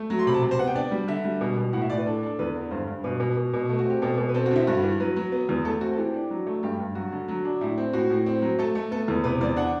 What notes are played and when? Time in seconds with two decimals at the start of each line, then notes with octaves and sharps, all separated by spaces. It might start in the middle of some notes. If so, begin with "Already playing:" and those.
Already playing: A3
0.10 F#3
0.19 C6
0.27 C3 B5
0.34 A5
0.42 C3
0.51 C5
0.59 B3 F#5
0.67 G5
0.75 D4 D5
0.91 G3
1.08 D3 E5
1.24 G3
1.41 B2
1.57 B2
1.73 A2 F#5
1.82 E5
1.89 A2 D5
1.98 B4
2.06 D4 A4
2.23 D4 A4
2.39 E2 B4
2.56 D3
2.71 G2 C5
2.87 G2
3.04 B2 B4
3.20 B2
3.37 B2
3.54 B2
3.69 A3
3.79 F#4
3.85 C4 G4
4.02 B2 A4
4.18 B2
4.29 B4
4.34 C4 A4
4.46 F#4
4.51 D3 E4
4.67 G2 F#4
4.83 E3
5.00 F#3 B4
5.16 F#3
5.32 B3
5.49 E2
5.65 A3 A4
5.81 C4 F#4
5.93 A4
5.98 E3 G4
6.14 D4
6.31 F#3
6.47 A3
6.63 G2 G4
6.80 G2
6.95 F#3 F#4
7.12 D3
7.28 F#3
7.45 D4
7.61 A2 E4
7.78 C4
7.93 A2 F#4
8.10 A2
8.26 C4
8.42 F#3
8.59 A3 A4
8.75 A3
8.91 B3 A4
9.08 E2
9.24 C3 B4
9.41 E2 D5
9.56 D4 F#5